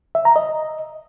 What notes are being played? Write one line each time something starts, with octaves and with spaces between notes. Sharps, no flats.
E5
A#5
D#5